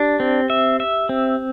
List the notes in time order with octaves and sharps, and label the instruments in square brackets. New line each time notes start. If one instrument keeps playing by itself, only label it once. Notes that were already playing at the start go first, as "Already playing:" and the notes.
Already playing: [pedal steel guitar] D4 [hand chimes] G4
[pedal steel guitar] C4
E5
E5
C4